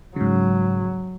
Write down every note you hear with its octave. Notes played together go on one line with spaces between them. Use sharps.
G#2 C#3 F#3